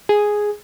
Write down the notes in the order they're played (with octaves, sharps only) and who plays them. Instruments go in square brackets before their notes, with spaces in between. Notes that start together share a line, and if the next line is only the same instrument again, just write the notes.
[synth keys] G#4